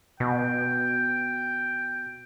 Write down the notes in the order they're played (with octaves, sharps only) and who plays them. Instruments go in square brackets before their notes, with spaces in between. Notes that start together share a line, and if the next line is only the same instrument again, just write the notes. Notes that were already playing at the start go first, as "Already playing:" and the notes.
[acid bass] B2 [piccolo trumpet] G5